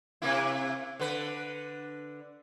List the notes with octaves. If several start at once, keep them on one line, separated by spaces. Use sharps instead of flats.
C3 A#3 E4
D3 B4